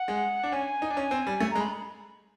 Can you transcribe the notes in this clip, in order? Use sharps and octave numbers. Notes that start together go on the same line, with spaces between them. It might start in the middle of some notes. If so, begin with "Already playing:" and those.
Already playing: F#5
G#3
D4
C#4 G#5
D#4
D4
C#4
C4
G3
A3
G#3 A#5
B5